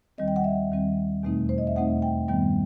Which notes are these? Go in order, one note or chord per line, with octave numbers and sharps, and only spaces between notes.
D#2 D#3 G3 C4 D#5
G5
F#5
E5
D#2 D#3 G3 C4
E2 B2 A3 C4 D#4
C5
D#5
E5
E2 B2 A3 C4 D#4 F#5
G5
G2 D#3 G3 B3 G5